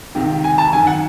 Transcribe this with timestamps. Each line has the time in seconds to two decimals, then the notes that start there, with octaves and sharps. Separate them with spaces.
0.14 C#2 C3 D#3
0.44 G#5
0.58 A5
0.72 F#2 D#3 G#5
0.87 F#5